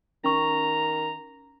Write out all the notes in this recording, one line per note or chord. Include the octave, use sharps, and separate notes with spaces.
D#3 C#4 A#5 C#6